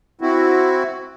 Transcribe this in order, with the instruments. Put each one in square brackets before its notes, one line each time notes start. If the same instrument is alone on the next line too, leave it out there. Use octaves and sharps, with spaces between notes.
[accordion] C4 E4 F#4